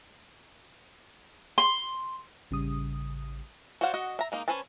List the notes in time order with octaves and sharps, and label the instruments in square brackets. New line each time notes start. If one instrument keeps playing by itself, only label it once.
[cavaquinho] C6
[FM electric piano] A1 C#3 G3 D#6
[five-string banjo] F#4 C5 D5 F5 F#5
F#4 D#5 F#5
E5 A#5
G#3 A#3 D#4
C#4 B4 C5 G#5 A5